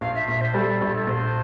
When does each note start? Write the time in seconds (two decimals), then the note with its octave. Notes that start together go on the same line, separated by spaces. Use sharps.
0.01 A#1 F5
0.15 E5
0.28 A#1 E5
0.41 C5
0.54 G3 A4
0.81 A#1
1.07 A#1 C5